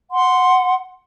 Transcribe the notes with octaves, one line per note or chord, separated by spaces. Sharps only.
F#5 C6